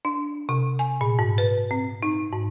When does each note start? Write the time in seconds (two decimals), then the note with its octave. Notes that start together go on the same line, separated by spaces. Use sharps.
0.05 D4
0.49 C3
0.79 G#5
1.01 A#2
1.19 G#2
1.38 B4
1.71 C4
2.03 D#4
2.33 G#2